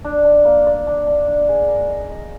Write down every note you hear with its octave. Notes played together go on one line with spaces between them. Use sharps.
D4
D4
A#3
D5
D4
D4
D4
G#4
A#4
D#5
D#5